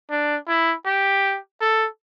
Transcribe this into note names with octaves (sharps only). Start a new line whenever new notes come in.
D4
E4
G4
A4